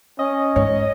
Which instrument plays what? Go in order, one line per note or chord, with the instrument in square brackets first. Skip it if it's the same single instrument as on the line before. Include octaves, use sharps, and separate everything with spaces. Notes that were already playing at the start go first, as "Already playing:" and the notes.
[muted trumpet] C#4 [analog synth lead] D#5
[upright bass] G#2 [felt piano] C#5